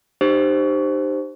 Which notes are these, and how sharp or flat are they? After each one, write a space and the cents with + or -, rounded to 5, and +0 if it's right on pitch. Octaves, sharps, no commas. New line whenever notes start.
D#4 -40 G4 +0 C5 +0